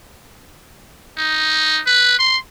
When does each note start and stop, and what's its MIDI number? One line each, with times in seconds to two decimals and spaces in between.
1.18 1.81 63
1.87 2.14 71
2.19 2.37 84